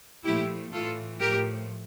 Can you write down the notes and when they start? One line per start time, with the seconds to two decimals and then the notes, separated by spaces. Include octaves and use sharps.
0.24 A#2 F3 A3 E4 G4
0.72 A2 E3 A3 F4 A4
1.18 A2 F3 A3 G4 A#4